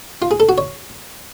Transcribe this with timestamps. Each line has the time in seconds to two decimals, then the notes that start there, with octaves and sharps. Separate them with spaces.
0.22 F4
0.31 G#4
0.40 A4
0.49 F#4
0.58 C#5